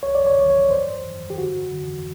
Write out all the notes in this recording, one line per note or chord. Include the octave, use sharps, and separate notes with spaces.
C2 C#5
D5
C#5
C2 D5
C#5
G2 C5
G2
G4
D3 F#4
D3